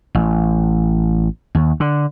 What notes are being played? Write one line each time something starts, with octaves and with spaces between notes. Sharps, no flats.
A1
D#2
D3